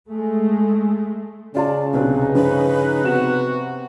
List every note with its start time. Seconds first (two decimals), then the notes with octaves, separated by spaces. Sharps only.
0.10 G#3 A3
1.55 C#3 C#4 F4 D5 A5
1.93 B1 C3 D4 D#4 B4
2.35 G2 F3 B4
3.04 C3 B3 F#4 E7